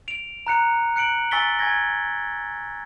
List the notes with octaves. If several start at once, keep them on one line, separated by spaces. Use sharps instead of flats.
D7 F7
A#5 F#6 C#7 F7
F#6 C#7 D7 F#7
G#5 C#6 E6 A6 B6 G7
G#5 C#6 G#6 A#6